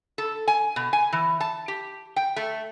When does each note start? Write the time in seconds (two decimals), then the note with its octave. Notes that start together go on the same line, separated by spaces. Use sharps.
0.18 A4
0.48 G#5
0.76 B2
0.93 G#5
1.13 E3
1.40 A5
1.68 G4
2.16 G5
2.36 A3